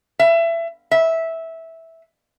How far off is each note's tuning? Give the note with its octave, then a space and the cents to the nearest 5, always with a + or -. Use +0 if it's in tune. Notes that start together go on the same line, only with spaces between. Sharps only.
E5 +25
E5 -10